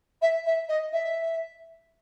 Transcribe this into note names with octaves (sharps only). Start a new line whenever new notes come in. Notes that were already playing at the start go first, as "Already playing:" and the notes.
E5
E5
D#5
E5